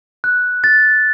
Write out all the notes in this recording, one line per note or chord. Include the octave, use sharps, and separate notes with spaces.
F#6
A6